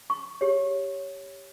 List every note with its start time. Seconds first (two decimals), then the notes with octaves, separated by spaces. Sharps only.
0.10 C#6
0.41 G4 C#5